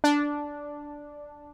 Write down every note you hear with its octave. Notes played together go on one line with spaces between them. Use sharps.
D4